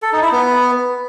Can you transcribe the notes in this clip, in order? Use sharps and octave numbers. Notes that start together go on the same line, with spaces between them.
A4
D#4
E4
B3